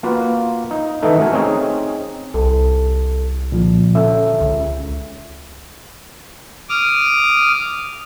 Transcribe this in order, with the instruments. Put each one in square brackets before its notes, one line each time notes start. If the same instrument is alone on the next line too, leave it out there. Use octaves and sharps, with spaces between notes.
[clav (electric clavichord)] A#3 F4 F#4 B4
D#4
D#3 E3 A3 D#4 A4
A3 F#4 A#4 G#5
C4 C#4 D#4 G#4
[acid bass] C2 [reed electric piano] A4
[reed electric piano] A#2 D3 F3
[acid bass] D3 [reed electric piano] C#4 A4 E5
[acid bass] C#2
[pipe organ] D6 D#6 F6